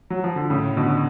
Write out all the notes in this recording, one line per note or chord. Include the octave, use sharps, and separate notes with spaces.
F#3
F3
D3
A2 C#3
B2 D3